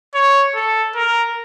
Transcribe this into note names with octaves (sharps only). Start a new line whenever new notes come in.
C#5
A4
A#4